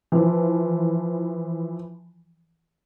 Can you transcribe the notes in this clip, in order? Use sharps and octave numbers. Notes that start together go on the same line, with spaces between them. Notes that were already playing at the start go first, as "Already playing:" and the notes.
E3 F3